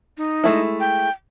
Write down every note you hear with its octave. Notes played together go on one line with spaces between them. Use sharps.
D#4
G#3 A3 E4
G5